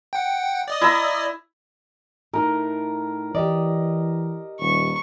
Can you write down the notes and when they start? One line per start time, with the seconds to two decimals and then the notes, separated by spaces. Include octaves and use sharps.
0.13 F#5 G5
0.68 D5 D#5 D#6
0.81 E4 A#5 E6
2.33 A2 D#4 A#4
3.35 E3 G4 D5 D#5
4.60 D#1 C#6